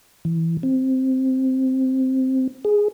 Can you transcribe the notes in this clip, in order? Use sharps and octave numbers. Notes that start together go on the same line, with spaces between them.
E3
C4
G#4